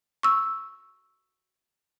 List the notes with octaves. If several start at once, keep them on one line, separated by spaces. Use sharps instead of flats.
C#6 E6